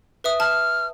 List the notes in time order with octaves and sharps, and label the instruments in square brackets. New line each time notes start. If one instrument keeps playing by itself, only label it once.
[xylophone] B4 E5 D#6
[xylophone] A5 [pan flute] F6